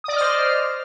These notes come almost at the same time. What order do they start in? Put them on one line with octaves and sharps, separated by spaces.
D#6 D5 D#5 F6 C5